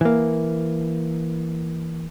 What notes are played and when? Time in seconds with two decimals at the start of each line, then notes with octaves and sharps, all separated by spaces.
0.01 E3 A#3